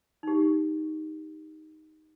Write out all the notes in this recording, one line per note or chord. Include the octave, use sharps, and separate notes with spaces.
D#4 G4